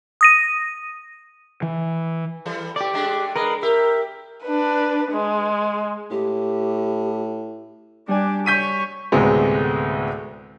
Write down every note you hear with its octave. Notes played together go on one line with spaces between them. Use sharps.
D#6 A#6 D#7
E3
E3 G3 A4
A3 G4 D5
G#3 A3 D4
G#3 A#4 B4 D#5
G4 A#4 E5
D4 B4
G#3
A2 G4
G3 D4 G4 D5 G#5
C#5 C#6 G6 B6 D#7
D2 A2 C3 G#3 B3